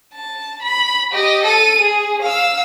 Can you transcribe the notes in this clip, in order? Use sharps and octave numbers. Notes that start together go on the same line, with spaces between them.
A5
B5
G4 D#5
A4 D#7
G#4
F5 E6